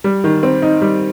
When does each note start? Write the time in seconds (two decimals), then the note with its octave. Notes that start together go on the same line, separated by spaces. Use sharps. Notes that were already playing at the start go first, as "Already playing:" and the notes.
0.04 G3
0.24 D#3
0.43 C4
0.62 D#4
0.82 G3